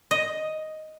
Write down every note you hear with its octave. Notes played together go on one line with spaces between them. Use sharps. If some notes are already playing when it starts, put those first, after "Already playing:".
D#5